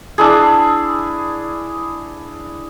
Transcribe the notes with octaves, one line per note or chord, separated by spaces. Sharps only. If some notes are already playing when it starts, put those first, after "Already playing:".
D4 E4 G#4